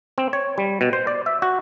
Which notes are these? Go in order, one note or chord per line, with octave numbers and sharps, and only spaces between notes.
C4
C#5
G3
B2
C5
D5
E5
F#4